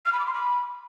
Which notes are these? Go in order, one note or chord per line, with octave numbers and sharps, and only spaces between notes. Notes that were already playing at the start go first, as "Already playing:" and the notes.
F6
B5
D6
C6
B5